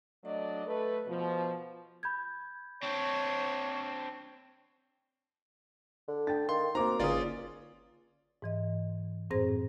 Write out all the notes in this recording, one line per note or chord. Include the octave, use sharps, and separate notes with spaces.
F#3 A3 D4 D5 D#5
A3 A4 B4
B2 F3
B5 G6 G#6
C4 D4 C#5
D3
D4 G5 A6
D#3 F5 C6
A#3 C4 D#4 F#4 A#5 C6 D6
G1 C#2 D3 C#4 F4 D5 D#6
G#2 E3 D#5
F#2 A2 C4 G#4 C5 A#6